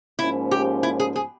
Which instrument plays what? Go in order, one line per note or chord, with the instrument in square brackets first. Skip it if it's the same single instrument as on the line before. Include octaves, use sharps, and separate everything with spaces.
[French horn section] G#2 F3 A#3 C#4 [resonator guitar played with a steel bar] E4
[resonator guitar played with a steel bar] G4
E4
G#4
G#4